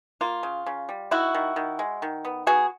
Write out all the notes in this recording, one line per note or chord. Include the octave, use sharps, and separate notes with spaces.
A#3 F4
C#3
C#3
G3
D#3 E4 F#4
D#3
D#3
G#3
D#3
B3
B3 F#4 G#4